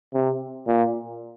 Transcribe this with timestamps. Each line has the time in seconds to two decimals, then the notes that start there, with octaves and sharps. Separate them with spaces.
0.14 C3
0.67 A#2